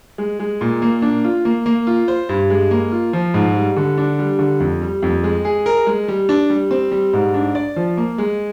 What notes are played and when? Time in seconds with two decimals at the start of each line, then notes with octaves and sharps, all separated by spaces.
0.18 G#3
0.39 G#3
0.61 A#2
0.82 A#3
1.02 D4
1.24 F4
1.45 A#3
1.66 A#3
1.87 F4
2.08 C5
2.29 G2
2.50 G#3
2.71 A#3
2.92 F4
3.13 F3
3.34 G#2
3.55 G3
3.77 D3
3.98 D4
4.19 G3
4.39 D3
4.60 F2
4.82 G3
5.03 F2
5.24 G#3
5.45 G#4
5.66 A#4
5.87 G#3
6.08 G3
6.29 D4
6.50 G3
6.71 C4
6.92 G3
7.13 G#2
7.34 D4
7.55 D5
7.76 F3
7.97 A#3
8.18 G#3